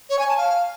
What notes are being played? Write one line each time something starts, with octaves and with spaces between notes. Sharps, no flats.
C#5
G#5
A5
F5